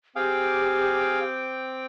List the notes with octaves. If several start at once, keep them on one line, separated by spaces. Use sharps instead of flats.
C4 G4 G#4 F5 G5 D6